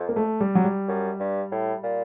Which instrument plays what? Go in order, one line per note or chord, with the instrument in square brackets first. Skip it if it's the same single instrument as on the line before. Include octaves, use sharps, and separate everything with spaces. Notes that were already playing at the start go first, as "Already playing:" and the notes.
Already playing: [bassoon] F2
[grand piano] A#3
A3
G3
F#3
G3
[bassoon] F#2
G2
A2
A#2